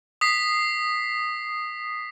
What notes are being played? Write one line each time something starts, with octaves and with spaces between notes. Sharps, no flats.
D#6 B6 C7